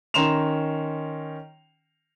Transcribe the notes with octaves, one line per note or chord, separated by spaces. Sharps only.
D#3 C#4 A#5 C6 E7 F7